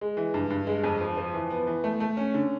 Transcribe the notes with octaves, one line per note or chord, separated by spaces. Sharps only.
G#3
E3
G2
G2
G#3
F2
F3
F3
E3
B3
E3
A3
A3
C#4
D3